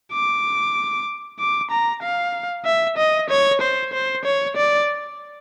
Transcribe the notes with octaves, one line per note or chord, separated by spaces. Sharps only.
D6
D6
A#5
F5
E5
D#5
C#5
C5
C5
C#5
D5